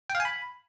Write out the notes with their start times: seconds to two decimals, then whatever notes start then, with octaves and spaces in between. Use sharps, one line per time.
0.10 G5
0.15 F5
0.20 G#5
0.25 B5